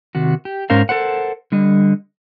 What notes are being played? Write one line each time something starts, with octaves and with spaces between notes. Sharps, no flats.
C3 D#3 F#4
G4
G#2 C#4 A#4 C5 F5
A4 A#4 C5 F#5
D3 G3 D#5